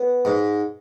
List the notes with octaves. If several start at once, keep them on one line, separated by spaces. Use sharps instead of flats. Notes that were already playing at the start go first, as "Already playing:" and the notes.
Already playing: B3
G#2